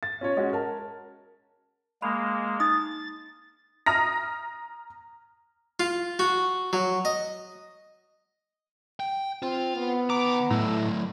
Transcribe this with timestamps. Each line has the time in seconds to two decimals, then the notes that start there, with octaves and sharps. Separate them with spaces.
0.03 A6
0.21 C#4 F4 C#5
0.37 G#3 C#4 F#4
0.53 A#4 A5
2.02 G#3 A#3 B5
2.60 D#4 D#6 A6
3.86 A#5 D#6 F6 A#6
5.80 F4
6.19 F#4
6.73 F#3
7.05 D#5
9.00 G5
9.43 C4 F4
9.77 B3
10.10 D#3 A#5 D6
10.50 A2 F#3 A3